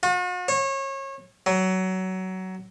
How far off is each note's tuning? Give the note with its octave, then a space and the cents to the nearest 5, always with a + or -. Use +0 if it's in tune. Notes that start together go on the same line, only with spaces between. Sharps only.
F#4 -45
C#5 -30
F#3 +20